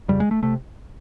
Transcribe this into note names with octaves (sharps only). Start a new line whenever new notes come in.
F2 C#3 G3
G#3
A3
C3 A3